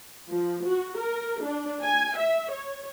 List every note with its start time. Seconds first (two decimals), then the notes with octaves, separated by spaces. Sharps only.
0.30 F3
0.66 F#4
0.99 A#4
1.44 D4
1.83 G#5
2.17 E5
2.52 C#5